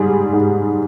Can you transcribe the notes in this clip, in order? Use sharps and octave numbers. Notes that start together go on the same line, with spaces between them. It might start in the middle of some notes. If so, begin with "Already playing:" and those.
Already playing: G#2 G3 G#4
G#2